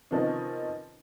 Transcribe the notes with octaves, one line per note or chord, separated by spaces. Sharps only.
C3 D#3 F3 B3 C#4 D#4